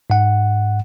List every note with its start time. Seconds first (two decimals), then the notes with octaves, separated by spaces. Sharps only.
0.10 G#2 F#5